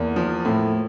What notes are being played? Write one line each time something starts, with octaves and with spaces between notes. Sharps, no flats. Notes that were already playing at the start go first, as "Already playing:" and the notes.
Already playing: E2 A#3
F3
A2